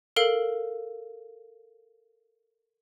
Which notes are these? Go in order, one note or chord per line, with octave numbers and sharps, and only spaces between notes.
A4 A#4 F5 D7 F#7